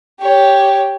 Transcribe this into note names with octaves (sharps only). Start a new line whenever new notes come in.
G4 C#5